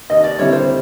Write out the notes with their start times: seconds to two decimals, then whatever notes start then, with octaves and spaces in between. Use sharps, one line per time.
0.10 D#2 D#5
0.24 D5
0.39 D3 G3 C4 E4 C#5
0.53 C5